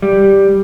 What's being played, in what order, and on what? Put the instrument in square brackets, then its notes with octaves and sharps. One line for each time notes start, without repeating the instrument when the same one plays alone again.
[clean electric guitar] G3